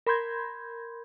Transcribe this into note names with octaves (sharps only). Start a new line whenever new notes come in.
A#4 B5 C6 G6 G#6